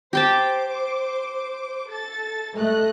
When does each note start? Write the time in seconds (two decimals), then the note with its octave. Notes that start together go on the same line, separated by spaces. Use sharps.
0.13 G4 C5 G5 A5 D6
1.88 A4 A6
2.57 A3 D#5 F#6